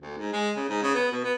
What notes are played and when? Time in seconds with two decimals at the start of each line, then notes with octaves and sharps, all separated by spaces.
0.01 D2
0.18 G#2
0.33 G#3
0.56 C#3
0.69 G#2
0.83 C#3
0.95 B3
1.12 B2
1.24 B3